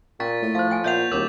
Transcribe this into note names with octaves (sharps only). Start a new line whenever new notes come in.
A#2 C#4 A#5 C#6 A6 B6
A2
F3 C5 F5
E4 G5 G#5
A#2 C#5 E5 F#5 G6 F7
D1 D#2 A#4 C#5 D6 A6 F#7